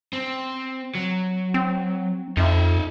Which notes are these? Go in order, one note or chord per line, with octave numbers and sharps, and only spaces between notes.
C4
F#3
C4
F2 D#4 E5